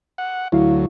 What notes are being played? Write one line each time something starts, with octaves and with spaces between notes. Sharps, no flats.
F#5
D2 F#3 E4 F5